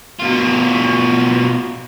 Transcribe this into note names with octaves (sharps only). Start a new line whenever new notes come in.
B2 F4